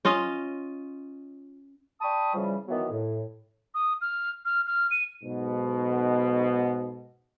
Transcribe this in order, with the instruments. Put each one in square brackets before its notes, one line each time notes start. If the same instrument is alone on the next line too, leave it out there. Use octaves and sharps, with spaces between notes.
[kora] C#4 F4 D#5
[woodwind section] D5 G5 A5 B5 C#6 D#6
C#3 E3 F3 G3
D#3 E3 F#3 B3
A2
[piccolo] D#6
F6
F6
F6
D#7
[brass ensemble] B1 G#2 B2